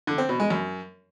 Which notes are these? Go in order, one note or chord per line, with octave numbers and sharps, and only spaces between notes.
D3
C4
B2
G#3
F#2